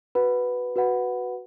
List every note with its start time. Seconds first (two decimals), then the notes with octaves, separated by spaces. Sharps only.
0.15 F#4 B4 F#5 B5
0.76 F#4 B4 F#5 B5